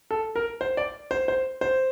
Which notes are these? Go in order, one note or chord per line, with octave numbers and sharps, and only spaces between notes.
A4
A#4
C5
D5
C5
C5
C5